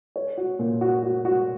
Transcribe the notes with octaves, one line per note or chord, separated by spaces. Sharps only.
C#5
F#4
A#2
F#4
F#4
F#4